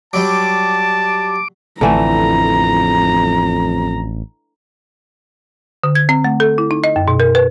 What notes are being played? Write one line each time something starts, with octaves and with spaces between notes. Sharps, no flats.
F#3 G3 A5 D6
A1 F2 D3 E3 A3 A#5
D3
G#6
C4
A3
A4
E4
D#4
D#5
F#2
B2
A#4
B4